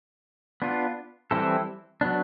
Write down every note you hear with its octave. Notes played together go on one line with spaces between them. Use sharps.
B3 D4 F4
E3 G3 C4 E4 A4
F#3 B3 D4